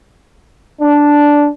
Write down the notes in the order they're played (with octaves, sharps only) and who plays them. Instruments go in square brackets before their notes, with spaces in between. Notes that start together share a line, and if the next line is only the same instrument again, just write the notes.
[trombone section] D4